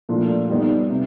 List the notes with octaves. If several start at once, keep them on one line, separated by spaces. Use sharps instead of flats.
A#2 F3 A3 D4 F4
G3 B3 D#4
C3